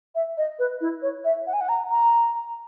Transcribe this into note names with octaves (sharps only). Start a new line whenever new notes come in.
E5
D#5
B4
E4
C#5
E5
F#5
G#5
F#5
A#5
A#5